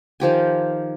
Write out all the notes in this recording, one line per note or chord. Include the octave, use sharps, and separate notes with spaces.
D#3 F3 G4 G#5